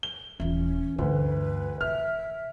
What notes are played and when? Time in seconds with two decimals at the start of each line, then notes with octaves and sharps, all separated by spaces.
0.03 G7
0.40 D#1 E3 C#4 E4 F4
0.98 D2 G2 B4
1.81 C3 E5 F6